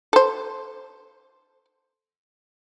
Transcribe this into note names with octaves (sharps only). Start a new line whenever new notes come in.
A4 C5